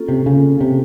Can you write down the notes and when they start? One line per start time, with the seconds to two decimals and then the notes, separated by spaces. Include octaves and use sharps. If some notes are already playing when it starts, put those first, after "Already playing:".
Already playing: A#3 C#4 F4 A4
0.09 C3
0.26 C#3
0.61 C3